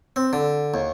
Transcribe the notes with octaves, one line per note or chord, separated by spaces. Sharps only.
C4
D3
D#2